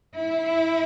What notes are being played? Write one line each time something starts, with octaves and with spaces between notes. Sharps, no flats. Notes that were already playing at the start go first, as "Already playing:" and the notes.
E4